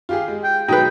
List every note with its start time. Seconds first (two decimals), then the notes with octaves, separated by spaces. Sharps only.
0.09 F4 G4 G#4
0.28 G#3
0.44 G5
0.68 B2 F#3 G#3 D#4 B4 G5